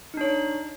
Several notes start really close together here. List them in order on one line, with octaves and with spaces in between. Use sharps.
D#4 D4 C#5